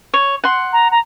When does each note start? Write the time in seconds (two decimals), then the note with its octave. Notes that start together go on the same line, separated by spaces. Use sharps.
0.14 C#5
0.44 F#5 C6
0.73 A#5
0.91 A#5